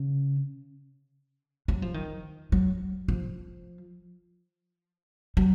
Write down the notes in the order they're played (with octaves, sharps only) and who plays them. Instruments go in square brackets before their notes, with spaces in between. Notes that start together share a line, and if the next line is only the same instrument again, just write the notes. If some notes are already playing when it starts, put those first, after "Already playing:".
Already playing: [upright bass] C#3
F#3
F3
D#3
F#3
F3
F#3